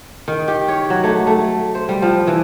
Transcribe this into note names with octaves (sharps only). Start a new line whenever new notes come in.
D#3
G4
C#5
F#3
A3
A3
C5
G3
F3
E3